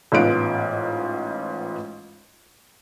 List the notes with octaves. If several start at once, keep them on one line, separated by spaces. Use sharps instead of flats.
A1 G#2 B3 F4 F#6 D7